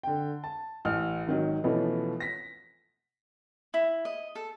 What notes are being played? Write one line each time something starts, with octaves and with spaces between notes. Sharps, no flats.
D3 G5
A5
A1 F6
G#1 D#3 F#3
B2 E3 F3 A3 B3 C#4
A#6 B6
E4
D#5
A4